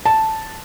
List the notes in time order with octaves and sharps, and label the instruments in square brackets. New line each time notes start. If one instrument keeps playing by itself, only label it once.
[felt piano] A5